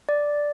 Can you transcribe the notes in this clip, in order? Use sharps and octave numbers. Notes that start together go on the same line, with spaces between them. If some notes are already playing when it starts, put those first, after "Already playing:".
D5